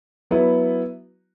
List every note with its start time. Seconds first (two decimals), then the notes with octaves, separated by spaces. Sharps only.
0.31 F#3 B3 E4